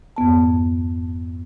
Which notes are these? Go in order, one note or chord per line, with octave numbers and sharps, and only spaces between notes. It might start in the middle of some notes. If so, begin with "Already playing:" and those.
F2 G#2 B3 A5